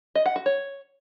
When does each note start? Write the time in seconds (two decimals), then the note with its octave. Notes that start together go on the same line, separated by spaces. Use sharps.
0.15 D#5
0.26 F#5
0.36 F#4
0.46 C#5